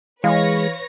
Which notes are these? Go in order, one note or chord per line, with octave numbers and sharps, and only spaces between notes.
E3 G#3 B4 C#5 F5 A#6